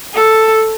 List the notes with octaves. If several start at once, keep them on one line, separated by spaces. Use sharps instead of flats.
A4